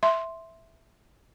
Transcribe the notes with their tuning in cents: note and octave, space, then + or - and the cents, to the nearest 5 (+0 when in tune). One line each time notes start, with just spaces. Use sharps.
E5 +0 C6 +0